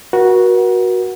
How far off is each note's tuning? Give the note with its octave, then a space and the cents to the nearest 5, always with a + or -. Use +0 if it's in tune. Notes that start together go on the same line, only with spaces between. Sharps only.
F#4 +0 A#4 +45